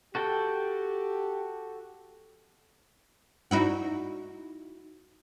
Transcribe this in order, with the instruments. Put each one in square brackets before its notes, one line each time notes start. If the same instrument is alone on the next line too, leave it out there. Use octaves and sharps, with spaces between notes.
[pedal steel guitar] F#4 A4 G5 [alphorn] G4
[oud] D#4 E4 F#4